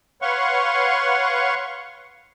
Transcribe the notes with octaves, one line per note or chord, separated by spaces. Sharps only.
B4 C#5 F5 F#5 C6 C#6